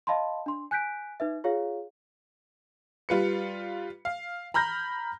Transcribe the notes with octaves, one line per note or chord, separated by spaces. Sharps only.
D#5 F5 A5 B5 C6
D4 C6
G#5 F#6 G6 B6 D7
D#4 B4 E5
F4 G#4 C#5 F5
G3 F4 B4 C#7
F5
A#5 B5 F6 G6 A#6